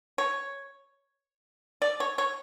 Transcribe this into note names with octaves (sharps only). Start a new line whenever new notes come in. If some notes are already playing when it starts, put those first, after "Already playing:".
C#5
D5
C#5
C#5